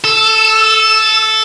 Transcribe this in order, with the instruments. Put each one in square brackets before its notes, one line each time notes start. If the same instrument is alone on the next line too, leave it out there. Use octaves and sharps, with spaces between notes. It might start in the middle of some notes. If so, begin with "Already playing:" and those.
[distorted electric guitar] A4 [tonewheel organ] E6